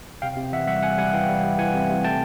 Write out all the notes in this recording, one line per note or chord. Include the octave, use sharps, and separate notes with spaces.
C3 F5 G5
C3
E3 E5 F#5
G3 E5 F#5
C3 F#5 G#5
G3 F#5 G#5
E3 F5 G5
G3
G3
E3 F#5 G#5
C3
C3
A3 G5 A5